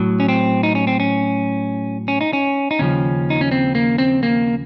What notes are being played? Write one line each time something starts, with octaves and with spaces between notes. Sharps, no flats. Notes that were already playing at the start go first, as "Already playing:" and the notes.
Already playing: A2 F#3
C#4
C4
D#4
C#4
C4
C#4
C#4
D#4
C#4
D#4
D#2 C#3 F3 C#4
D#4
C#4
C4
A#3
C4
A#3